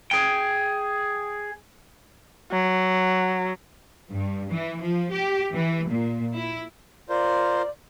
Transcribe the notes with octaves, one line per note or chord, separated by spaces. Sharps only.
G#4 G5
F#3
G2
E3
F3
G4
E3
A#2
E4
F4 A#4 C5 D5